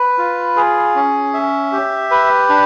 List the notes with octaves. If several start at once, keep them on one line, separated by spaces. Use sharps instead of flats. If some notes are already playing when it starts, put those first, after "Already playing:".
Already playing: B4
F4
G#4
C#4
E5
G4
B4
D4